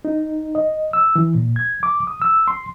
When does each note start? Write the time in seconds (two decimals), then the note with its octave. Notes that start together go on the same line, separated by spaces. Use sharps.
0.05 D#4
0.55 D#5
0.93 E6
1.16 E3
1.35 A#2
1.56 G#6
1.83 D6
2.07 D#6
2.22 E6
2.48 C6